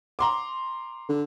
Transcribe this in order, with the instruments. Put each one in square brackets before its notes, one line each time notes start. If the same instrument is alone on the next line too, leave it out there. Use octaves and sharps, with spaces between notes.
[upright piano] A#5 C6 D6
[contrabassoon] D3